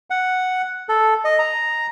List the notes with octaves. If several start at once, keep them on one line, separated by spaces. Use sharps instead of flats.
F#5
A4
D#5
A#5